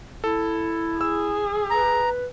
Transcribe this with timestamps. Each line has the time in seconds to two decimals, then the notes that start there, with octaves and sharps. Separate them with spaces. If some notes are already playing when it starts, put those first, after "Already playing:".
0.24 E4 A4
1.01 G#4 E6
1.70 B4 A#5